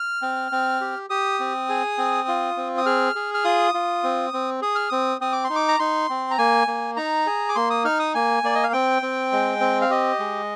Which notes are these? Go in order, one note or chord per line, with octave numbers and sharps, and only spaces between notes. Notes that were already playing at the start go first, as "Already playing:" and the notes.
Already playing: F6
C4
C4
G4
G4 D#6
C4
G#4
C4
F4
C4
D#6
G#4 F6
G#4
F6
F4 D#6
F4
C4
C4
G#4 D#6
F6
C4 D#6
C4 D#6
D6
C6
D#4
D6
A#5
D#4 C6
C4
A#5
A#3 G#5
A#3
D#4 A#5
G#4
D6
A#3 C6
D#6
D#4 F6
D#6
A#3 G#5
A#3 D5
D#5
F5
C4 G5
C4
G#3
C4
F5
G4 D#5
G#3